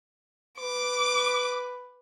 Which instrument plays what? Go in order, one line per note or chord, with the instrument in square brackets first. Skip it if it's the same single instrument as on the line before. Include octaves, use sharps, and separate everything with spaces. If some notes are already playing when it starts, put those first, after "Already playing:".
[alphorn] B4 [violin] D6